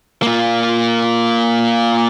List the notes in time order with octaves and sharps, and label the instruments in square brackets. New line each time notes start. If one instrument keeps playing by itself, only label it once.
[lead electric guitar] A#3 F4